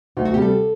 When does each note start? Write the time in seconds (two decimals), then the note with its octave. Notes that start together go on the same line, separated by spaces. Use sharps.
0.17 D2 D#4
0.25 F#4
0.33 C3 G4
0.37 G3 A4